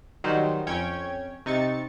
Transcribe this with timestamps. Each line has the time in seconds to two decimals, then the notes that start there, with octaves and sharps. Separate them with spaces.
0.24 D#3 F#3 G3 D#4 C5
0.67 F2 C#4 C#5 G5 G#6
1.46 C3 D#4 C#6 A6 C#7